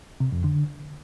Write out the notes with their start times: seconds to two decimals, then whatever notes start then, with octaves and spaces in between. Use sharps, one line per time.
0.20 C3
0.32 F2
0.44 D3